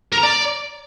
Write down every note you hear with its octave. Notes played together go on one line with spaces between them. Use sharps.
A#4
A#5
D5